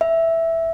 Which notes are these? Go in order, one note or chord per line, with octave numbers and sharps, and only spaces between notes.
E5